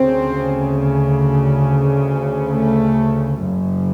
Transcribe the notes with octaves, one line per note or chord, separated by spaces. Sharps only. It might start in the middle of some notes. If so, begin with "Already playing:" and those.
Already playing: D2 C#3 C4
A3
F#1 F#2 C#3